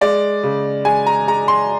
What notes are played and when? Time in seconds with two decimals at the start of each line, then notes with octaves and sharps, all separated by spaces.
0.01 G#3 D5
0.43 C#3
0.85 G#3 G#5
1.07 A#5
1.28 G#3 A#5
1.48 C6